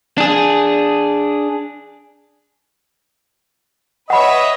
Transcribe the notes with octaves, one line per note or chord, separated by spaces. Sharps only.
D4 G#4
B4 C#5 D#5 E5 F#5 B5